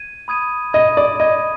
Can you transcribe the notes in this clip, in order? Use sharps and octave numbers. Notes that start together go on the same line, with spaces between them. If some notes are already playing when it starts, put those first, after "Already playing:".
Already playing: G#6 D#7
B5 D#6 G#6 D#7
D#5 B5 D#6 G#6 D#7
D5
D#5 B5 D#6 G#6 D#7